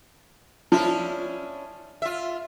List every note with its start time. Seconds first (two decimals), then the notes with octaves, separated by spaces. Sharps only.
0.72 F3 C#4 D4 E4
2.02 F4 E5